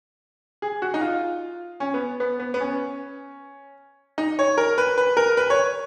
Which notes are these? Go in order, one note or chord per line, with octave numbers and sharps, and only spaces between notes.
G#4
F#4
D#4
F4
C#4
B3
B3
B3
B3
C#4
D#4
C#5
A#4
B4
B4
A#4
B4
C#5